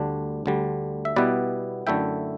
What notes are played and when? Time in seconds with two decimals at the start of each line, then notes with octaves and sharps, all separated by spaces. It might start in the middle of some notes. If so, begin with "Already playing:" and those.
Already playing: D2 D3 G3 D4
0.46 D2 D3 G3
1.05 E5
1.16 B2 G3 B3 E4 B4 D5
1.87 F#2 D3 A3 E4 E5 G5